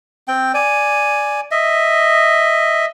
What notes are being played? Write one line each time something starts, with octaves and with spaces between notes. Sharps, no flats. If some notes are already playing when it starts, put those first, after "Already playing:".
C4 G5
D5 G#5
D#5 E5